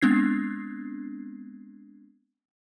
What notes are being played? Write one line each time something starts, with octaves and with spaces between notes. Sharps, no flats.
G#3 B3 C4 D4 G#6 C7